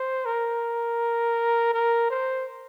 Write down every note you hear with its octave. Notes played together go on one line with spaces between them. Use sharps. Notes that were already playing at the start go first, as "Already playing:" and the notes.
Already playing: C5
A#4
A#4
C5